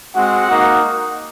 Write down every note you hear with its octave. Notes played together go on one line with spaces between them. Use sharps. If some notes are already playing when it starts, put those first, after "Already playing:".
G#3 C4 F#4 F#5
A#3 D#4 F#4